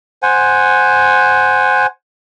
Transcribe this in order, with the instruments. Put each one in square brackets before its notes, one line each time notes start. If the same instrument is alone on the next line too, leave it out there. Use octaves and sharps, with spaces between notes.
[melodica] C5 F#5 G#5